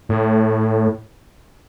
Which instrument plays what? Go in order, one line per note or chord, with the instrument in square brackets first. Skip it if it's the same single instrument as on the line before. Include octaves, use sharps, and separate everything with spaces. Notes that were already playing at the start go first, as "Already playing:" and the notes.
[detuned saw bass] A2